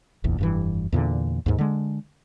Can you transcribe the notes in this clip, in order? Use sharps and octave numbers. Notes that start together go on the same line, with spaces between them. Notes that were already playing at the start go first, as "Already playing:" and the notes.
F1 A#1 E2
F1 G2 E3
E2 A#2 D3
D#2 G#2
D3 G#3